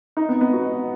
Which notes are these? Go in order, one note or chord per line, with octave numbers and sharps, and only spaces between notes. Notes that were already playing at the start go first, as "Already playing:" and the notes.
D#4
B3
B3
F#4
D#5